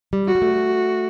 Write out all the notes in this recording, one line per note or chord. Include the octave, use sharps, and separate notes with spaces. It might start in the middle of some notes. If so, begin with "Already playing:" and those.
G3
F#4
G3
A3